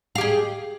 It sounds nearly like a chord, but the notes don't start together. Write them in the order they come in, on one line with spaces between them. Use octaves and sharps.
F5 G4 G#4